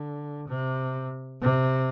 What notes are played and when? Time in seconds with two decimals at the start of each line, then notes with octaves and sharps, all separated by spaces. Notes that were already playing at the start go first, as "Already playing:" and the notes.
Already playing: D3
0.48 C3
1.42 C3